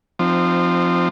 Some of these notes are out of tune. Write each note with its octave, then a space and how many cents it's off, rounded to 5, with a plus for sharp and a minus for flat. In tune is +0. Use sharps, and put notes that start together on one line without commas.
F3 +0 C4 -10 D#4 -35